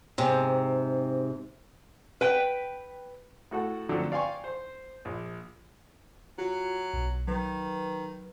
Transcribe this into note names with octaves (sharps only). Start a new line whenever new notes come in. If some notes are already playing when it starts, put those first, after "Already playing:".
G#2 C3
B4 G5
A2 F#4 A4 F#5
D3 F3 F#3 A3 C4
D5 F5 G5 G#5 C6 C#6
C5 C6
A#1
F#3 F4 F#4
B1
D#3 F#3 B4